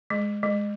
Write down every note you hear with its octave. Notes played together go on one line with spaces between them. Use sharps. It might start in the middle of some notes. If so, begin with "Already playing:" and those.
G#3
G#3